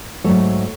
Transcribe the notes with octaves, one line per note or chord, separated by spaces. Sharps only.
G#2 F#3 A3 A4 C#5